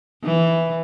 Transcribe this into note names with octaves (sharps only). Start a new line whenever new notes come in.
E3